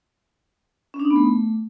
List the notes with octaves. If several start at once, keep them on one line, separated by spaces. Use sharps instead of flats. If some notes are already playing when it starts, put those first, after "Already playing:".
C#4
D4
D#4
B3
A3